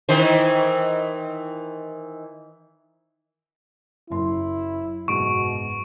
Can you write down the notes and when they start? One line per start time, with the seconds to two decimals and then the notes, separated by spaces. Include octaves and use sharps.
0.09 D#3 E3 C5
4.10 F#1 F#2 E4 C6
5.08 F#1 G#2 B2 C#6 D7